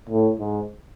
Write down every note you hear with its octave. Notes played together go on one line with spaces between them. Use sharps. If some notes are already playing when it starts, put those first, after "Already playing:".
A2
G#2